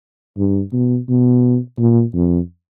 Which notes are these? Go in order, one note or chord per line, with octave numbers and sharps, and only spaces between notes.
G2
B2
B2
A#2
F2